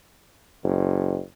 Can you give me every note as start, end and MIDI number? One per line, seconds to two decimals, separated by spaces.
0.63 1.19 30